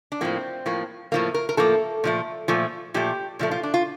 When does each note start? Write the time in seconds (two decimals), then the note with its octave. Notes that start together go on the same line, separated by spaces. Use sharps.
0.12 D4
0.21 A2 F3 A#3 C4
0.66 A2 F3 A#3
1.12 A2 F3 A#3
1.34 A#4
1.49 A#4
1.57 A2 F3 A#3 A4
2.04 A#2 F3 A3
2.48 A#2 F3 A3
2.94 A#2 F3 A3 G4
3.39 A#2 F3 A3
3.51 F4
3.63 D4
3.74 F4